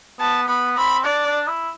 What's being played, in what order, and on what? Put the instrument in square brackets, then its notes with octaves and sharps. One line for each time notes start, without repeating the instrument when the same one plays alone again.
[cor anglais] B3 [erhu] A5
[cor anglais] B3 [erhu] B5
[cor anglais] C4 [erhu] B5
[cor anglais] D4 [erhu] D5
[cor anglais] D4
E4